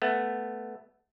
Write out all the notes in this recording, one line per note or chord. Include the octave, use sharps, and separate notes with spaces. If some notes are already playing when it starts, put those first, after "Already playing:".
A3 B3